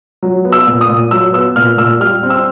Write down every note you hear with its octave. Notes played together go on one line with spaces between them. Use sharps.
F#3
B3
E6
A#2
D#6
A#2
F#3 E6
B3 E6
A#2 F6
A#2 E6
G3 F6
C4
E6